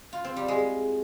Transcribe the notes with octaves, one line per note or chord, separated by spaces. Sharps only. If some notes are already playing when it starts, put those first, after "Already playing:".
F4
C4
G3
G#3